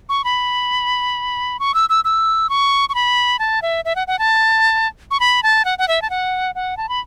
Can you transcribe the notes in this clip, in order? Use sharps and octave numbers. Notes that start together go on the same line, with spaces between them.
C#6
B5
C#6
E6
E6
E6
C#6
C#6
B5
A5
E5
E5
F#5
F#5
A5
C#6
B5
A5
F#5
F#5
E5
A5
F#5
F#5
A5
B5